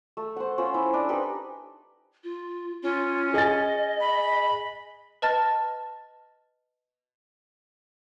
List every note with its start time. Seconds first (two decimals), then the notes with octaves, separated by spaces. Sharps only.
0.17 A3
0.36 C5 F#5
0.58 C#4 F4 C5
0.74 E4
0.94 D4 D#5
1.09 D#4 G4 B4 G#5
2.24 F4
2.83 C#4 F4
3.34 G#4 D#5 G#5 A6
4.00 B5
5.22 B4 D#5 A5 F6 A6